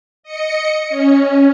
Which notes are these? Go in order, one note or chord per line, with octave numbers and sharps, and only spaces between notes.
D#5 C#7
C#4